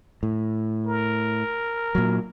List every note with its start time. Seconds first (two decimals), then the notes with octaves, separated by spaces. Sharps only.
0.23 A2
0.87 A#4
1.95 A#2 F#3